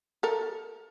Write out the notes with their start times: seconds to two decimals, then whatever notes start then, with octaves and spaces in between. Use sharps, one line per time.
0.23 A4 A#4